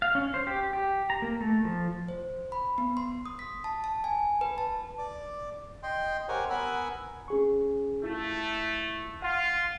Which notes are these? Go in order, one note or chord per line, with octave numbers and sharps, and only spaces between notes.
F5
C#4
C5
G4
G4
A#5
A#3
A3
F3
C5
B5
B3
C6
D#6
B6
A5
A5
G#5
B4
A5
D5 D6
D#5 G5 C6
G4 A#4 C5 C#5 F#5 G#5
B3 A#4 F#5 G#5 B5 E6
C#4 G#4 C#6
A3 E4 F4
F4 F#5